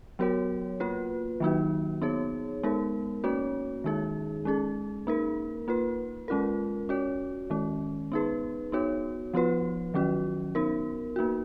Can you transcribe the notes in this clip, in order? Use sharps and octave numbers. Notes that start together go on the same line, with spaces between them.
F#3 B3 F#4 A#4 C#5
A#3 F4 B4
D#3 F#3 A#3 D#4 F#4
B3 D#4 G#4 C#5
G#3 B3 D#4 A#4
A#3 C#4 F#4 C#5
D#3 G#3 D#4 G#4
G#3 C#4 G#4
A#3 D#4 A#4
A#3 F4 B4
G#3 C#4 F4 A#4
C#4 F#4 C#5
D#3 G#3 C#4
B3 D#4 G#4 B4
B3 D#4 F#4 C#5
F3 B3 F4 B4
D#3 F#3 C#4 F#4
B3 D#4 A#4
A#3 D#4 F#4